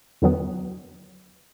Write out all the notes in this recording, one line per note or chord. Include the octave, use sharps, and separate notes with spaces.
E2 D3 F#3 B3